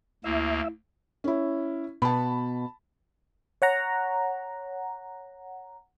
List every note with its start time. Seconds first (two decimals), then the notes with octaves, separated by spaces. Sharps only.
0.24 D2 A#3 E4 E5
1.24 C#4 E4
2.02 B2 A5 B5
3.62 C#5 F#5 A#5